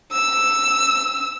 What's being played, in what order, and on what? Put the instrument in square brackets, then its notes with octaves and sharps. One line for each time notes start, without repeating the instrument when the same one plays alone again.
[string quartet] E6